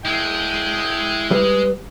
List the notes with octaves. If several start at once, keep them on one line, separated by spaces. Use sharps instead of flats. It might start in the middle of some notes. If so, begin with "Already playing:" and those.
G#3 E4 G5
G3 B4